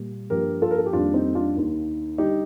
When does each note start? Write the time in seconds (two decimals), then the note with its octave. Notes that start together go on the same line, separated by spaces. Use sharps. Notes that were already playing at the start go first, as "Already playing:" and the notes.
Already playing: A#2 G3 A#3
0.30 G2 F3 A#3 G4 A#4
0.62 F4 A4
0.71 A#4
0.78 A4
0.86 G4
0.93 F2 D#3 G3 A#3 D4 F4
1.14 C4 D#4
1.35 D4 F4
1.56 D#2 D#3 A#3
2.18 D3 G3 D#4 G4